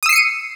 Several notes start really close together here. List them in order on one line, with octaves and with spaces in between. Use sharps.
D#6 E6 C7 C#7 D#7